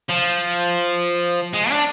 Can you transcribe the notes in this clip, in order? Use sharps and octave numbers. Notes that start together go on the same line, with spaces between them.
F3
G#3
D4